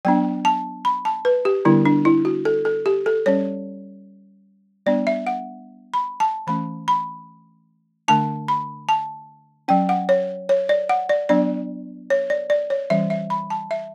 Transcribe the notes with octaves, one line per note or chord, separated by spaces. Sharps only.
F#3 B3 D4 G5
A5
B5
A5
B4
G4
D3 G3 B3 D4 E4
D4
E4
F#4
A4
A4
G4
A4
G3 C#4 C#5
G3 B3 D4 D5
E5
F#5
B5
A5
E3 A3 C#4 B5
B5
D3 A3 D4 A5
B5
A5
F#3 C#4 G5
F#5
C#5
C#5
D5
F#5
D5
F#3 B3 D4 D5
C#5
D5
D5
C#5
E3 G3 C#4 E5
E5
B5
A5
E5